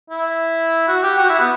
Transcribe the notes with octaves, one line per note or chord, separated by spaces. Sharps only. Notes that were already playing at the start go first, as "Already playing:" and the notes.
E4
F#4
G4
F#4
E4
B3